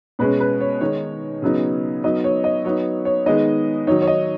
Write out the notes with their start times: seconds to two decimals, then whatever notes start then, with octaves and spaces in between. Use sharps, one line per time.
0.19 B2 G#3 C#4 B4
0.40 B4
0.61 C#5
0.81 D#3 G#3 D#4 C#5
1.42 C#3 F#3 B3 D#4
2.04 F#3 B3 D#4 D#5
2.24 C#5
2.44 D#5
2.64 F#3 B3 D#4 C#5
3.05 C#5
3.26 D#3 G#3 B3 D#4 D#5
3.87 D#3 F#3 D#4 C#5
4.02 C#5
4.07 D#5